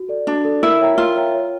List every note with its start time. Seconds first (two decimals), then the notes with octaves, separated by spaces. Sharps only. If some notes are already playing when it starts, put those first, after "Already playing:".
Already playing: F#4
0.09 A4 D5
0.27 D4 F#4
0.45 A4 D5
0.62 E4 A#4
0.81 C#5 E5 G5 A#5
0.98 F4 A#4
1.16 C#5 E5 G5 A#5
1.34 C#5